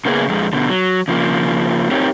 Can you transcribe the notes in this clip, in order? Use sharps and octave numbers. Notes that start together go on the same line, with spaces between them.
C#3 A#3 B3 C#4 G4 G#4
F2 G#3
B2 D3
F#3
C#3 F3 A#3
C4 D#4 G4 A#4 C#5